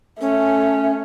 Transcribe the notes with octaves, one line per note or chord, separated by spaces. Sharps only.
A3 C#4